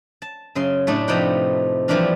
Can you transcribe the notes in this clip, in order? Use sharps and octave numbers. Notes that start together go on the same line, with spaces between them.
A5
F#2 C#3 C6
A2 A3 D4 D#4
C3 F3 D#4 B4 F#5 G5
E3 F3 G3 A#3 D4 F4